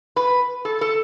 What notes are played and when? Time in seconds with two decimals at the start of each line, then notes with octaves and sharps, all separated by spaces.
0.16 B4
0.65 A4
0.81 A4